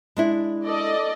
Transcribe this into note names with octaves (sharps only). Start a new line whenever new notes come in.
G#3 D4 E4
A4 D5 D#5